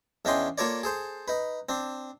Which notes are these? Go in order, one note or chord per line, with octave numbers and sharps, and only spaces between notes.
E2 C#4 D4 D#5 G5 C6
A#3 F4 A4 A#4 C#5 D5
G#4 A4 C5
D#4 B4
C4 D4